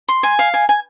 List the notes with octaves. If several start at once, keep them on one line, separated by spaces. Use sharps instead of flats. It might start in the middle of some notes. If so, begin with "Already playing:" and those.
C6
G#5
F5
G#5
G#5